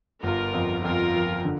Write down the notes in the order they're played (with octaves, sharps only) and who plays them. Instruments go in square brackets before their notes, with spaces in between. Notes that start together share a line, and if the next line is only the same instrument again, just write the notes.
[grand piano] G1 [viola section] F4 A#4
[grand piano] F2
[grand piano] F2 [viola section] F4 A#4
[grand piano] F3
D3